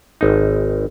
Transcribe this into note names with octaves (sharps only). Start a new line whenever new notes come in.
G#1 D#4